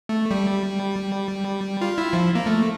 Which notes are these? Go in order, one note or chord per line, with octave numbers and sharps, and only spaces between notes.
A3
G3
F4
E4
F3
A#3
A3